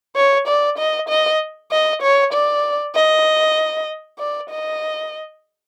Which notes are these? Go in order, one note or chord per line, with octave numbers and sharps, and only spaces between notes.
C#5
D5
D#5
D#5
D#5
C#5
D5
D#5
D5
D#5